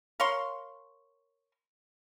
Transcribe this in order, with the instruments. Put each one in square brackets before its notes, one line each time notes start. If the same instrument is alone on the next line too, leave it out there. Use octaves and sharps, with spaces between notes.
[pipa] A#4 C#5 F5 C6